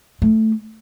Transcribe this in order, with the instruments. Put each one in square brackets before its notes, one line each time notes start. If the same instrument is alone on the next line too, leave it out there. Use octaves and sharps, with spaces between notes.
[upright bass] A3